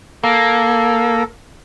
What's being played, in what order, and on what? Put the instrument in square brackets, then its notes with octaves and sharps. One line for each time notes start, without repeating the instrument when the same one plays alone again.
[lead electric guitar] A#3 [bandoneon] A4